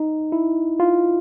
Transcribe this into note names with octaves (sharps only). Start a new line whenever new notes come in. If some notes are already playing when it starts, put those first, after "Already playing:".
Already playing: D#4
E4
F4